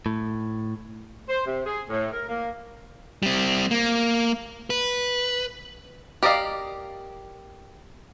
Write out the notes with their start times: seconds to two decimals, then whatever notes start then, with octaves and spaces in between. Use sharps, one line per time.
0.06 A2
1.29 C5
1.47 C3
1.66 G#4
1.90 A2
2.13 A#4
2.29 A#3
3.23 G3 C4
3.71 A#3
4.70 B4
6.23 G4 A#4 D5 D#5 F5